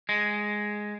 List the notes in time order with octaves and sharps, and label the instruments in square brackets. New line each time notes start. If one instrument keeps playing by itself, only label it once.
[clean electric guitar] G#3